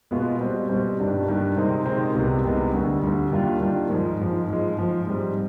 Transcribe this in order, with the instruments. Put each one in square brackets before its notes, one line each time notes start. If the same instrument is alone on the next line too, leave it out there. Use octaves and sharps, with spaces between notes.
[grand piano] B2 G#3 B3 F4
B2 G3 C4
B2 G3 C4
G2 D#3 G3 D4
G2 D#3 G3 D4
C3 D#3 G#3 C4 D#4
C3 D#3 G#3 C4 D#4
C2 C3 D#3 G#3 B3
C2 C3 D#3 G#3 B3
D2 D3 G3
D2 D3 G3
D#2 D#3 G3 D4 F4
D#2 D#3 G3 D4 F4
G#2 F3 G#3
G#2 F3 G#3
G#2 F3 G#3
G#2 F3 G#3
G#2 G3 C4